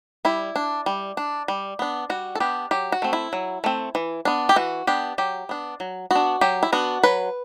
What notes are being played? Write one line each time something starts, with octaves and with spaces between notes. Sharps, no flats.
G3 E4
D4
G3
D4
G3
B3 D4
G3 F#4
A4
B3 D4 G4
F#3 G4
F#4
A3 C4
E4
F#3
A3 C4
E3
B3 D4
G4
E3 F#4
B3 D4 G4
F#3 G4
B3 D4
F#3
B3 D4 F#4
F#3 G4
E4
B3 D4 F#4
F#3 B4